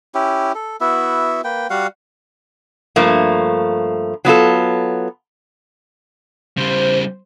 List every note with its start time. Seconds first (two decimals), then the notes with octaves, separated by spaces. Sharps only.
0.14 C#4 E4 G4
0.55 A4
0.81 B3 E4 F#4 E5
1.44 A#3 B4 G5
1.70 G3 F#4 F5 F#5
2.96 G2 F3 A3 A#3
4.25 F#3 B3 F4 A4
6.57 C#3 G3 C5